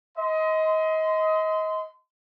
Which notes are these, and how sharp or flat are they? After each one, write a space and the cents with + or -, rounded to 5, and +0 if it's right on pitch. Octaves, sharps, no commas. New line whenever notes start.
D#5 +25 C6 -25